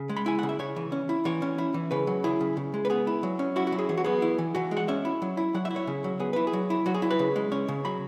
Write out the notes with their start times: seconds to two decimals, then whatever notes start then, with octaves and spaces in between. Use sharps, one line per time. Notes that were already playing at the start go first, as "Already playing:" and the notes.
Already playing: C#3
0.09 G#3
0.16 B5
0.26 E4 G#5
0.39 C#3 F#5
0.49 E5
0.59 C#3 C#5
0.76 E3
0.92 C#4
1.09 E4
1.25 E3 C#5
1.42 C#4
1.58 E4
1.74 E3
1.91 C#3 B4
2.07 F#3
2.24 E4 G#4
2.41 C#3
2.57 C#3
2.74 G#3
2.85 B4
2.90 B3 G#4
3.07 E4
3.23 F#3
3.39 C#4
3.56 E4 F#4
3.67 F#4
3.72 F#3
3.79 G#4
3.89 E3 G#4
3.97 F#4
4.04 B3 G#4
4.22 E4
4.38 E3
4.55 E3 F#4
4.71 G#3
4.77 F#5
4.88 C#4 E5
5.05 E4
5.22 F#3
5.37 E4
5.54 F#3 F#5
5.65 E5
5.71 E4
5.76 C#5
5.87 C#3
6.04 F#3
6.20 B3 G#4
6.33 E4 B4
6.47 G#4
6.53 F#3
6.70 E4
6.86 F#3 F#4
6.94 G#4
7.02 E4
7.10 B4
7.19 C#3
7.36 G#3
7.52 C#4 C#5
7.68 C#3
7.85 F#3 B5